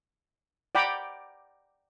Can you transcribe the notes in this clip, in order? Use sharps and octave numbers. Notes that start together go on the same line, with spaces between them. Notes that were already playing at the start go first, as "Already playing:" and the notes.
D5 F#5 G5 A#5 B5 D6